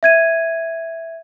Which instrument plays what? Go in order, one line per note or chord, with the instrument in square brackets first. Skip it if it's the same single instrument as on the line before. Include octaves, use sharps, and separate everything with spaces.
[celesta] E5 G#6 D#7